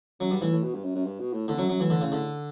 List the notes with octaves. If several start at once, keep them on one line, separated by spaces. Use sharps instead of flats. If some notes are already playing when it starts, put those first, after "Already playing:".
F#2 F#3
G2 G3
A2 E3
A2
B2
G2
F#2
F#2
G2
B2
A2
E2 A2 D3
F#2 F#3
F#2 F#3
A2 E3
D3
C#3
D3